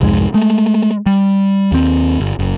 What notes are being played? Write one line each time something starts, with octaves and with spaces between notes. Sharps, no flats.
C2 F2 G#2 G#3
G#3 A3
G3
D#2 C4
G1
F#1